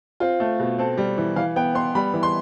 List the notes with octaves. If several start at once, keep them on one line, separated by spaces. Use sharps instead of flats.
C4 F4
A3
B2
C4 A4
G3
E3
E3 F5
B3 G5
B3 C6
G3 B5
E3
C6